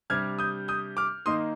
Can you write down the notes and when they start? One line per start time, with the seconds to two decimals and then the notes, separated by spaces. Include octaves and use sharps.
0.10 C3 G3 D4 F6 G#6
0.39 D#6 G6
0.68 D#6 G6
0.97 D6 F6
1.26 D#3 A#3 D#4 C6 D#6